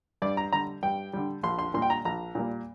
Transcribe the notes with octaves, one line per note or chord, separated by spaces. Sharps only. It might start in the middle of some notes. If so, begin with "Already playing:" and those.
G2 D5
A#5
D3 G3 A#5
G2 G5
D3 G3
A#1 C6
C6
A#2 G3 A#3 C6
G5
A#5
A#1 A#5
A#2 G3 A#3